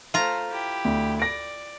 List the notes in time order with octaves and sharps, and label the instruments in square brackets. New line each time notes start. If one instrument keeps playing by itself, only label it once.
[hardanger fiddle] A3 C5 [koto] F4 A#5
[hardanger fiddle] E4 G4
[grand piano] D2
[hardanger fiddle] D5 [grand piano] A#6 D7